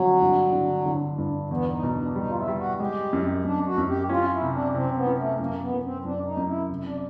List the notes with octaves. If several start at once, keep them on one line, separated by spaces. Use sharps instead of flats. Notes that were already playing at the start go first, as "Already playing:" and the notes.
Already playing: F2 D3 F#3
G2
D3
D3
G2
E2 B3
D#4
B2
D4
G3 D#4
F4
E4
G3
F#4
G#3 G4
F#2
F#2 D4
F#4
F#2
G4
C#4 F4
E4
C3
D4
C3 C4
B3
C#4
A3
F#2 A#3
B3
F#2
C4
F#2 D4
D#4
F#2
E4
F1
D4